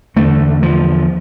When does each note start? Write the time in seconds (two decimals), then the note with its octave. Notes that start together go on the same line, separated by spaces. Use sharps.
0.16 E2 D3 A3
0.63 F3